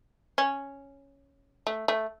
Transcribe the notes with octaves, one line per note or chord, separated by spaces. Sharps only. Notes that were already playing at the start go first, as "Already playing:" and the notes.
C#4
A3
A3